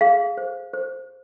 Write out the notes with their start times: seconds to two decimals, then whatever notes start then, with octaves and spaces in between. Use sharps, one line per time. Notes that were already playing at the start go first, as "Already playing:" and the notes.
0.01 G#4 F5
0.37 C5
0.73 C5